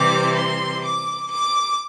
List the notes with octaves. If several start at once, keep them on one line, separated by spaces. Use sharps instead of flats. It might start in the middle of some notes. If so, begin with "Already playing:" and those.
Already playing: C3 E3 G3 C4 D6
C6
D6
D6